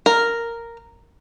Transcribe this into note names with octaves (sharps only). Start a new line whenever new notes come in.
A#4